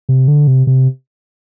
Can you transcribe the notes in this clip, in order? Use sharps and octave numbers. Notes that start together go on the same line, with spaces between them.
C3
D3
C3
C3